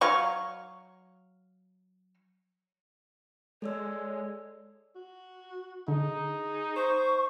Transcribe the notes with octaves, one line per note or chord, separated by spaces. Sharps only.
F#3 F5 C#6
G#3 A4 C#5 D5 E6
F#4
D3 D#4 G#4
C5 C#6